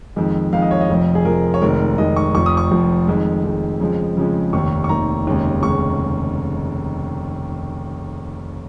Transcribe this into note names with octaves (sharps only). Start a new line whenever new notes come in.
F2 D#3 G#3
F2 D#3 G#3 F5
D#5
C#5
D#5
F1 F2 F3
G#4
F1 F2 F3 A#4
C#5
F1 F2 D#3 G#3 A#4
F1 F2 D#3 G#3 D#5
C#6
F1 F2 F3 C#6
D#6
C#6
F1 F2 F3
F2 D#3 G#3
F2 D#3 G#3
F2 C#3 F3 G#3
F2 C#3 F3 G#3
F1 D#2 D#3 C#6
C#6
F1 D#2 D#3 A#5
F1 D#2 C#3 G#3
F1 D#2 C#3 G#3 C#6